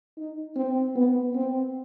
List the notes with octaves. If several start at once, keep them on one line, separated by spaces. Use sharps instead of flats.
D#4
C4
B3
C4